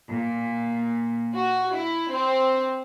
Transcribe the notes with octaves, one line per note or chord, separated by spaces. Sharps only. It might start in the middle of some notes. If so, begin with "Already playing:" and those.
A#2
F#4
E4
C4